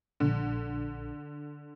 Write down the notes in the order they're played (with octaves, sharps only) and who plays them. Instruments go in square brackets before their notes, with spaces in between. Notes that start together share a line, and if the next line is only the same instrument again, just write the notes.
[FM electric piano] A#1 [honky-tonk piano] D3